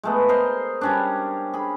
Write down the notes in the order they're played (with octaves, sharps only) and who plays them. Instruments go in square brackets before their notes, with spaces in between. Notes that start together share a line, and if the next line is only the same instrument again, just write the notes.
[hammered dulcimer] G#3 A3 B3
A#4 C5 D#5 C6
G3 C#4 D4
G#4 B5